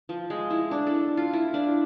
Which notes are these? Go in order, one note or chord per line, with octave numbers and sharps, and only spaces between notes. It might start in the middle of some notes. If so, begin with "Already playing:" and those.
F3
G#3
E4
D4
A4
F4
E4
D4